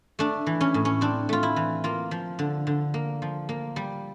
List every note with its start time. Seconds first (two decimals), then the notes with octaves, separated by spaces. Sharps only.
0.19 A3 D4
0.46 E3
0.61 C#4
0.74 A2
0.85 C#4
1.01 C4 D4
1.29 A3 F4
1.43 E4
1.56 E3
1.84 A#3 F4
2.11 F3
2.39 D3
2.67 D3
2.94 A#3
3.22 F3
3.49 A#3
3.76 G3